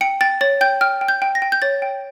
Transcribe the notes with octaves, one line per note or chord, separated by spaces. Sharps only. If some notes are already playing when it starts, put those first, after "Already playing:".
G5 C#7
G5 A6
C#5 A6
G5 G6
G5 F6
G5
G6
G5
A#6
G5
G6
C#5 A6
G5